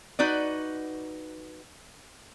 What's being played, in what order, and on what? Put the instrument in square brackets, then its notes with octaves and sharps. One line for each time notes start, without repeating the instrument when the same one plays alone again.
[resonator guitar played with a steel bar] D#4 F#4 B4 D5